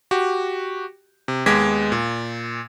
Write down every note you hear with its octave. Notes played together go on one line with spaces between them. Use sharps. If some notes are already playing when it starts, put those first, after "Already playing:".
F#4 G4
C3
D#2 G#3 B3 D6 G#6 B6
A#2